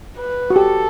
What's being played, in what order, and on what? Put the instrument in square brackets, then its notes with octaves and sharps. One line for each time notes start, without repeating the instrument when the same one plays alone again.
[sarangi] B4
[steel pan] F#4
[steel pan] G4 [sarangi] A4